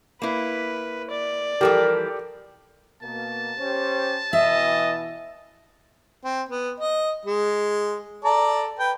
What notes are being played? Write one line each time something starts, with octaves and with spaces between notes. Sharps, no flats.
A#3 E4 B4
D5
E3 F3 G3 G4 A4 A#4 G5
B2 A#3 A5
C#4 G4 C5
B2 E3 D#5 E5
C4
B3
D#5
G#3
A4 D5 A#5
B4 G5